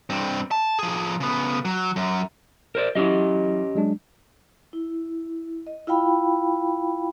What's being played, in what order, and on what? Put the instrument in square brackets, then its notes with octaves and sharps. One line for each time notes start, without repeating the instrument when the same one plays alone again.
[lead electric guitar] G2 C4
A5
F3 G#4
C#3 B3
F#3
F#2
[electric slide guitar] A#4 C5 D5
[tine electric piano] F#3 E4 [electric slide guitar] C#4 G4 D#5
[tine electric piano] F#3 G#3 D4
[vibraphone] E4
D#5
E4 F4 F5 G5 B5